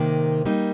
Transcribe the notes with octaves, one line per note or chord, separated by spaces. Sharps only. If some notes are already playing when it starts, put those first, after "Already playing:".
Already playing: C3 D#3 A#3
G3 A#3 D#4